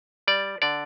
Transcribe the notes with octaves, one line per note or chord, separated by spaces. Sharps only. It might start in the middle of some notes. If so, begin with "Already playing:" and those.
G3 D5
D3 D5